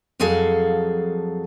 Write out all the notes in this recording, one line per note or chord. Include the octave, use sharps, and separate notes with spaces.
F2 F3 F#3 G#4 A4 F5